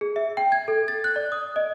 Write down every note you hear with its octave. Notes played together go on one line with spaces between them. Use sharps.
G#4
E5
G5
G#6
A4
A6
F#6
D5
D#6
D#5